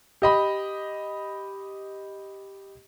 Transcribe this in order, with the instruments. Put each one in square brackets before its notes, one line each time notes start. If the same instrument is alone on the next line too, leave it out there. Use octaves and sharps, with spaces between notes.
[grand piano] G4 D#5 B5